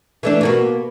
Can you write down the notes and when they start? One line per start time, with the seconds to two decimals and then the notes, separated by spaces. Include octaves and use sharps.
0.23 E3 A3 D4
0.41 B2 A#3 F#4